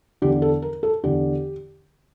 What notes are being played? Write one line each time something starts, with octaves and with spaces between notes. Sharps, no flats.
E2 D3 G4
A4
A#4
A4
E2 D3 G4